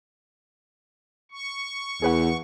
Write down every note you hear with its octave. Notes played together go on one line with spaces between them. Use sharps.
C#6
E2 G#4 B4 F#5